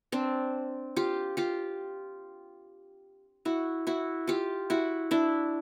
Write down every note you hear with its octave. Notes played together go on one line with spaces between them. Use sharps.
C4 D4
F4 G4
F4 G4
E4 F#4
E4 F#4
F4 G4
E4 F#4
D4 E4